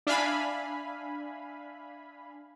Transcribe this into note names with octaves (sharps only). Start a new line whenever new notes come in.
D4 E5 F5 G#5 B5